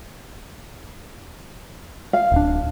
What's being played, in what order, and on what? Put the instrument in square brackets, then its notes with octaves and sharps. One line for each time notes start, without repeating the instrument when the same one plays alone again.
[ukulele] F5
[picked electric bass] D1 D4